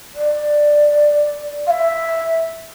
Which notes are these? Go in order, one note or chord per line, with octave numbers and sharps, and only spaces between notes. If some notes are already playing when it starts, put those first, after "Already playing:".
D5
F5
E5